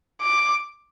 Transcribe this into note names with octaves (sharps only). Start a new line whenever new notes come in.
D6